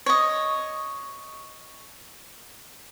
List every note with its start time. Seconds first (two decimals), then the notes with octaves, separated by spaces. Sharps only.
0.06 C#5 D#5